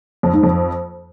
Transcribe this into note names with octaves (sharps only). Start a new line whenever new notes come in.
F2
G#2
F2